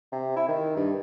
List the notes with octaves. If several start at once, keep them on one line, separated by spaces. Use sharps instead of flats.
C3
E4
D#3
G2